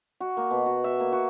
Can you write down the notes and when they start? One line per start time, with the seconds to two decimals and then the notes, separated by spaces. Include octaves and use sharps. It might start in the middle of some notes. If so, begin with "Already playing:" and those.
0.20 F#4
0.37 A#3
0.51 B2
0.66 F#4
0.84 E5
1.00 A#3
1.12 F#4